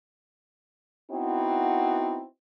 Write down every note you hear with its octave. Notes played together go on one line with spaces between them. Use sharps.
B3 C4 D#4 E4 F#4